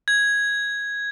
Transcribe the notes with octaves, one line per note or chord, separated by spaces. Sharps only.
G#6